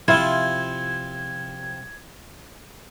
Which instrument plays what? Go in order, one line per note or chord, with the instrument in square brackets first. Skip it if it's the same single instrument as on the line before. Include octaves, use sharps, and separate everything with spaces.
[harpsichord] C3 F3 [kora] E4 F4 [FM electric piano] G#6